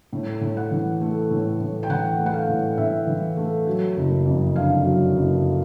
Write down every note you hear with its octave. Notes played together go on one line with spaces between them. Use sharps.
A2
A2
F#5
E3
A3
A2
A2
G5
E3 F#5
A3
F#5
F5
A2
A2 E5
E3
A3
F#3
F#1
F2
D3 F5
F#3
F#1